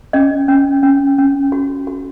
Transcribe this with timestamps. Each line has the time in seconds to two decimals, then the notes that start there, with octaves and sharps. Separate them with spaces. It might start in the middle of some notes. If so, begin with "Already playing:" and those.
0.13 C#4 D#5
0.48 C#4
0.83 C#4
1.18 C#4
1.52 F#4
1.87 F#4